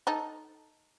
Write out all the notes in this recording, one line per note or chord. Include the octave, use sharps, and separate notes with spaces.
D#4 A4